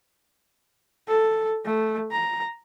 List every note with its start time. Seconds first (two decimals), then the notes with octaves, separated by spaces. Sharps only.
1.08 A4
1.65 A3
2.11 A#5